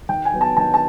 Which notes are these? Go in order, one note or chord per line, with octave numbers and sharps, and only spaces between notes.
D#3 G5
G#5
F#3 B3
A5
D#3 A5
A5